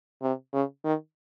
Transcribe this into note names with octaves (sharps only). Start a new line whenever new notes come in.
C3
C#3
D#3